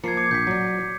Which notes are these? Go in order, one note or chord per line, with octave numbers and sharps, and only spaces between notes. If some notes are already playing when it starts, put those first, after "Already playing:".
F3 A#3 G#6 C7 C#7
D6 G#6 C#7
A#1 G6 B6
F#3 D5